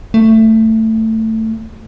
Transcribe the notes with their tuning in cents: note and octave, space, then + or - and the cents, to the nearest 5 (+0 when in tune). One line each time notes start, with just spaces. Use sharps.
A3 +15